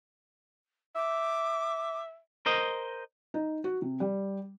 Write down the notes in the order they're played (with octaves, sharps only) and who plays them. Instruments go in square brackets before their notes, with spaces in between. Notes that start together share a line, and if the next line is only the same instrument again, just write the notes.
[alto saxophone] E5 [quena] D6
[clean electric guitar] A#4 C5 D#5
[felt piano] D#4
F#4
C3
G3